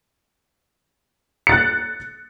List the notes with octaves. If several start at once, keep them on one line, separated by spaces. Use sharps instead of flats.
F#6 A6 C#7